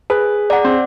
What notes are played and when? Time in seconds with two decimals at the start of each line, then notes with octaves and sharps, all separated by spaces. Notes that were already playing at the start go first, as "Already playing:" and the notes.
0.10 G#4 B4
0.50 D5 F#5 A#5
0.65 C4